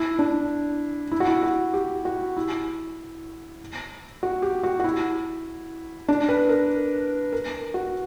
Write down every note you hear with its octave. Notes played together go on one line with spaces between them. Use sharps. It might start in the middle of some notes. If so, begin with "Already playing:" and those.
Already playing: E4
D4
E4
F#4
E4
F#4
G4
F#4
E4
F#4
G4
F#4
F#4
E4
D4
B4
A#4
A#4
F#4